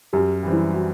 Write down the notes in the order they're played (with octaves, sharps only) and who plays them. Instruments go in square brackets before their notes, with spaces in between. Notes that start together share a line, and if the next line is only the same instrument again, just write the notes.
[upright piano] F#2 [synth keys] G4
[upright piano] E3 G3 C4
[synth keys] E4
F#4